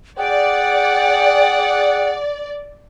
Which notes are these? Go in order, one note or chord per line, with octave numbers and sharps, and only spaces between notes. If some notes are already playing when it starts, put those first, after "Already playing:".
G#4 D5 F#5 G5